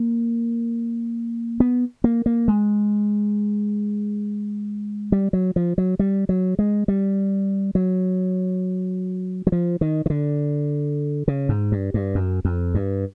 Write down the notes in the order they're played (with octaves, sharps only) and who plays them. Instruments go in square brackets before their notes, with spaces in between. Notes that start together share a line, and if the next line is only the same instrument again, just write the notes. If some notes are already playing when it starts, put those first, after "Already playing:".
Already playing: [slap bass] A#3
B3
A#3
A#3
G#3
G3
F#3
F3
F#3
G3
F#3
G#3
G3
F#3
F#3
F3
D#3
D#3
D3
C#3
G#2
G2
G2
F#2
F2
G2